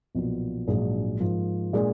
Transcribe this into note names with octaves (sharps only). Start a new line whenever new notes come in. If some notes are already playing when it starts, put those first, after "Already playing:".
B1 A#2 F3 B3
A#1 G#2 F#3 D4 G#4
G#2 F3 A#3
A#2 G#3 D4 G#4